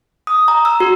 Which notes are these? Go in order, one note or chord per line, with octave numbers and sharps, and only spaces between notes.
D#6
A#5
E6
F#4